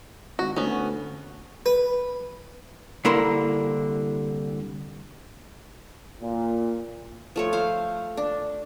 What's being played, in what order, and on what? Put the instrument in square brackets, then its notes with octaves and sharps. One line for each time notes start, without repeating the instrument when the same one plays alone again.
[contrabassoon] G#1 [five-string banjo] F#4
[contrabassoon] D2 [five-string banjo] B3 C#4
[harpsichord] B4
[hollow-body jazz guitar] C2 D3 A#3 E4 A#4 C6
[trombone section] A#2
[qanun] F3 A3 C#5
C5 F5
D4